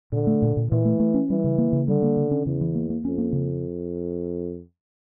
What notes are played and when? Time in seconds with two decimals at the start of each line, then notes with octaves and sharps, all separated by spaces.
0.12 A#2 D3
0.27 A3
0.42 A#2
0.57 A#2
0.71 A#2 E3
0.85 A3
1.00 A3
1.14 C#4
1.29 E3 G3
1.44 C#3
1.58 A#3
1.73 C#3
1.88 D3 G3
2.03 A#3
2.17 C#3
2.31 C#4
2.46 E2 C#3
2.61 E3
2.75 A#3
2.90 A#3
3.05 F2 C#4
3.18 A#3
3.33 C#3